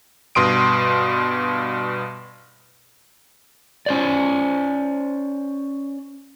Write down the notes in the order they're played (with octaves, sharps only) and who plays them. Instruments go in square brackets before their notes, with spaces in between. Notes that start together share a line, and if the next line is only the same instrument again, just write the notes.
[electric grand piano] G2 B2 C6 D#6 D7
[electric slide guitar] C#4 C5 D5